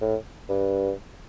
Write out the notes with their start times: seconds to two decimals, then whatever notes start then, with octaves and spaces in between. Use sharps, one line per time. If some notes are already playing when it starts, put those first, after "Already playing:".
0.01 A2
0.49 G2